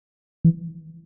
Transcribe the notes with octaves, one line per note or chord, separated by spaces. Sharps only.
E3